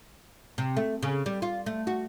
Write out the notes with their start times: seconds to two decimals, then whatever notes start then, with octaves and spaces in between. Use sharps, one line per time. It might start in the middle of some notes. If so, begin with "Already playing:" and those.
0.58 C3
0.77 A3
1.03 C#3
1.26 G3
1.42 F4
1.66 A3
1.87 F#4